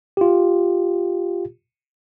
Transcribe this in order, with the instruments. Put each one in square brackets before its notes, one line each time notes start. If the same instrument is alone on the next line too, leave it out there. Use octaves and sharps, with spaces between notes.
[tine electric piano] F4 G4